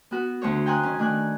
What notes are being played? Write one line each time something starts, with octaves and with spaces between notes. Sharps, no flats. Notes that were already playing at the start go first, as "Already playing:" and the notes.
B3 F#4 B4
D2 A3 C5 C#5
G5 G#5 A#5 C6 D#6 F#6
D#3 C#4
D#3 A3 D4 G#5 F#6